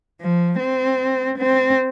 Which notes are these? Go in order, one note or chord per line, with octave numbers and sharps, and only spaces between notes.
F3
C4
C4